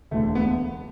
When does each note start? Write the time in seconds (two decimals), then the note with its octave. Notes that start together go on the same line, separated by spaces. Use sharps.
0.11 E1 D2 D3 A3
0.35 B3